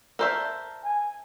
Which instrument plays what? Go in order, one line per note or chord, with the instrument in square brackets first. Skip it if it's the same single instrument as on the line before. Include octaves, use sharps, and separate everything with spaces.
[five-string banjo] A4 C5 E5 [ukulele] A#4
[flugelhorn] G#5